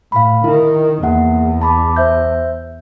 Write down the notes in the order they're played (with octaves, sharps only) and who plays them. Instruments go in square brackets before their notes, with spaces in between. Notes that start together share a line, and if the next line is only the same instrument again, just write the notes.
[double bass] A2 [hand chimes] F5 B5
[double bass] D#3 [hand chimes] E4
[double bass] E2 [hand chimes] A#3 F#5
[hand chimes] A5 B5 D6
C5 E5 G6